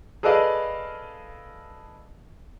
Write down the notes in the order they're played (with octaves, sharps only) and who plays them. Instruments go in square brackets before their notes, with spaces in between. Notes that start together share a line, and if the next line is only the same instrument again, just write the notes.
[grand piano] G#4 A4 B4 D5 D#5 F5